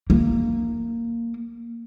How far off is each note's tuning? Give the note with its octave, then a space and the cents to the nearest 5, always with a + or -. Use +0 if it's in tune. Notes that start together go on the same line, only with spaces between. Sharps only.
A#3 -10